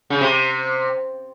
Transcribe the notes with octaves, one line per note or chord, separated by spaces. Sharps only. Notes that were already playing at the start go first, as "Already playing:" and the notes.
C#3
C3